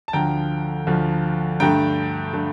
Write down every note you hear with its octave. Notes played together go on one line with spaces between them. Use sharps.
A5
D2 D3 F3 G5 A#5
D2 D3 F3
G2 D3 A3 G5 A#5
D3 A3